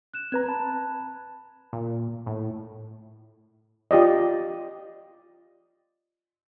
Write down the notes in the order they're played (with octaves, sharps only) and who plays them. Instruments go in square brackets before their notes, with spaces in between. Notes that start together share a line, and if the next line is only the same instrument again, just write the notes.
[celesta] F#6 E7
[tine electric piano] C4 B4 A#5 [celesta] F#6 G#6
[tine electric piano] A5 [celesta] B5
[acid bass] A#2
A2
[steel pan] F4 G4 D5 D#5